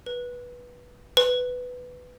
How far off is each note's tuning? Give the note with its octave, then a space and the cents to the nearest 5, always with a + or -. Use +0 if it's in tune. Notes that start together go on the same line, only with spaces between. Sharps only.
B4 -15
B4 +10